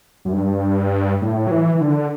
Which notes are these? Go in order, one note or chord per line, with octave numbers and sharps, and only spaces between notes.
F#2
G2
A2
F#3
E3
E3
D3